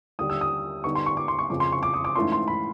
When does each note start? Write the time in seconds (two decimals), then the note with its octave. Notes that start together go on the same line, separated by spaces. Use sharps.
0.19 D#2 D3 G3 D#6
0.30 E6
0.41 D#6
0.84 D3 G3 B3 D#4 C#6
0.95 C6
1.06 C#6
1.17 D6
1.28 C6
1.39 C#6
1.50 F2 C#3 F3 D6
1.60 C6
1.72 C#6
1.83 D6
1.94 D#6
2.05 D6
2.16 G#2 E3 A3 C#4 F4 C6
2.32 C6
2.48 B5